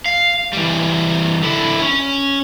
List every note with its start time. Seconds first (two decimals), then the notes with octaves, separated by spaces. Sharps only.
0.06 F5
0.53 E3 G3
1.42 D3 E4
1.81 C#4